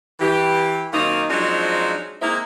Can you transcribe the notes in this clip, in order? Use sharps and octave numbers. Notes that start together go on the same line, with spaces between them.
E3 G4
F#2 D#3 A#3 C4 D#4
F3 F#3 G#3 C4 D4 D#4
G#3 A#3 C4 D#4 E4